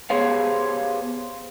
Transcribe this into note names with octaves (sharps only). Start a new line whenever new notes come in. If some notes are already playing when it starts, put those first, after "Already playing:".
B3 G4 G#4 C5 C#5 F5